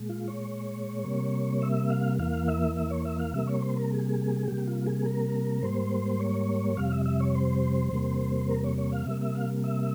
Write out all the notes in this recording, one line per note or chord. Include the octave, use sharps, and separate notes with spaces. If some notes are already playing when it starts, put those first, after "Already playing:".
Already playing: A#2 G#3
F4
C#5
C3 G3 A#3
E5
F5
E2 E3 A#3 F5
E5
E5
C#5
E5
F5
C3 G3 A#3 E5
C#5
C5
A#4
G#4
C3 G3 A#3 G4
F4
G#4
A#4
G#2 G3 A#3 C5
C#5
F2 C3 G3 F5
E5
E5
C#5
C5
E2 C3 G3 A#3
A#4
C#5
C#5
F5
C3 G3 A#3 E5
E5
F5
E5